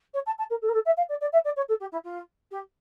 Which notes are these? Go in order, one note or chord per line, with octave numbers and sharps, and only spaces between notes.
C#5
A5
A5
A#4
A4
A#4
A4
E5
F5
D5
D5
E5
D5
C#5
A4
G4
E4
F4
G4